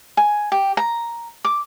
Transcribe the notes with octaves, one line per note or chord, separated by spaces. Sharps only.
G#5
G4
A#5
D6